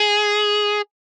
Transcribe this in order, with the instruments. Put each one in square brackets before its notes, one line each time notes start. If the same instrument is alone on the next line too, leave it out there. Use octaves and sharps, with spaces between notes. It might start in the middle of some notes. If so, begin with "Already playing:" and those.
Already playing: [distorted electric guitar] G#4